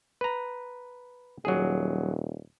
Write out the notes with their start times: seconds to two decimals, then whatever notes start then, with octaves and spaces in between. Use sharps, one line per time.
0.21 B4 A#5
1.45 D#1 F#3 G#4